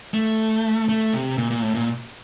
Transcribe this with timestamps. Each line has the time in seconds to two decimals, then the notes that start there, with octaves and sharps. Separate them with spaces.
0.14 A3
0.89 A3
1.13 C3
1.38 A#2
1.51 A#2
1.62 A2
1.74 A#2